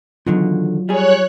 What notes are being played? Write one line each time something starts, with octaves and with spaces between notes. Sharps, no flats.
E2 D3 D#3 F#3 F4
G3 G#4 C#5 F#6